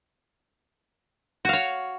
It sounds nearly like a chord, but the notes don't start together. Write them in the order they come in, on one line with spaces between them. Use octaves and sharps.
F#4 F5 C#5